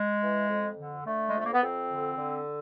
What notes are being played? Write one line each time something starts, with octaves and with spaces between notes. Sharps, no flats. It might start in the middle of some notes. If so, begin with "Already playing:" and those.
Already playing: G#3
E3
F2
D3
D3 A3
G#3
F2 A3
A#3
B3
F2 C4
D3
D3